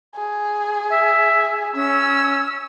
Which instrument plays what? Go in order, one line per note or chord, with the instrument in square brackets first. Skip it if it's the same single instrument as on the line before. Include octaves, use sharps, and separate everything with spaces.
[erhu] G#4
[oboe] E5
[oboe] C#4 [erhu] E6